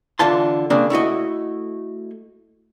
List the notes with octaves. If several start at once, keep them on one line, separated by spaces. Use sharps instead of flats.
D3 E3 F4 A5 C6
C#3 A#3 C4 D4
A3 E4 F#4 D#5